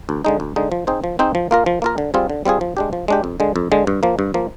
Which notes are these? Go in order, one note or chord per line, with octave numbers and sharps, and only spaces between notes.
D2
D3 G#3 D#4
D2
D3 G#3 D#4
F3
C4 D#4 G#4 C5
F3
C4 D#4 G#4 C5
F3
A#3 F4 A#4
F3
A#3 F4 A#4
D3
G3 C4 F4 G#4
D3
G3 C4 F4 G#4
F3
G#3 D4 G4
F3
G#3 D4 G4
F2
D3 G#3
F2
D3 G#3
G2
F3 A#3
G2
F3 A#3